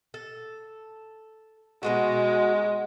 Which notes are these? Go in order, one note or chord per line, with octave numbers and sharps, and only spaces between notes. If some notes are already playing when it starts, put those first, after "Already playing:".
A4
B2 G#3 D#4 F#4